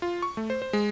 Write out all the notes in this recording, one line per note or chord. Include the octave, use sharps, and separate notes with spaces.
F4
C#6
A3
C5
C5
G#3